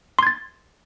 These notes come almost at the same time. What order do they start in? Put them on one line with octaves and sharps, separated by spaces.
C6 G#6 A6